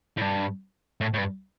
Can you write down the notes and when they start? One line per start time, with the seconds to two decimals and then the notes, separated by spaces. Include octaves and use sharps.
0.17 A2
0.22 G2
1.01 A2
1.14 A2
1.18 G2